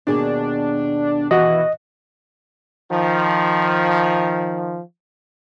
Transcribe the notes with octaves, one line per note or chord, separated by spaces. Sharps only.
D#2 B2 D4 G#4
E3 F#4 D#5
D#3 F3